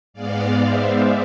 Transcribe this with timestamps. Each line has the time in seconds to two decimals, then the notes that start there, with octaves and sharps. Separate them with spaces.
0.14 G#2 G#3 B3 D5 F5
0.61 C5 E5